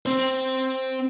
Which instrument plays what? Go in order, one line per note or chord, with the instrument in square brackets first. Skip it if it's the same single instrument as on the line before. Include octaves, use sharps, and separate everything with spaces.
[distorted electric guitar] C4 C5